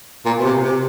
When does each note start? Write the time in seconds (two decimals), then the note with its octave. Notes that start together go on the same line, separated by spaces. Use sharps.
0.26 A#2
0.39 B2
0.45 C3
0.64 C3